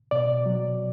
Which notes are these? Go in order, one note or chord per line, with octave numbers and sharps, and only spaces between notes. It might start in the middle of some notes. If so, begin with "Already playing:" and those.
B2 D5
F#3